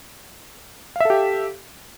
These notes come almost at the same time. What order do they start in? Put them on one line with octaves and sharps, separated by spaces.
F5 E5 A4 G4